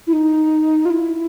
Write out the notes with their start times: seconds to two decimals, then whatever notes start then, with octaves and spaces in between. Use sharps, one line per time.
0.07 E4
0.13 D#4
0.85 F4
0.90 E4